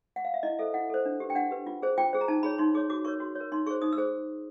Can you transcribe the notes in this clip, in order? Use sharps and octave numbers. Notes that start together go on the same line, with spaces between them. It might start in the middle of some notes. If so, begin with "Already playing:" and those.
F#5
F5
E5
E4 D#5
A4 C5 E5
E4 F#5
A4 C5
D4
G4 B4
G5
D4 F#5
G4 B4
F4
G#4 C5
F4 G5
G#4 C5
A#5
D#4 A5
G#4 C#5 B5
D#4 C6
G#4 C#5 D6
F#4 D6
A#4 C#5 C#6
F#4 C6
C#5
A#4
D#4 C6
G#4 C5 C#6
D#4 D#6
E6
G#4 C5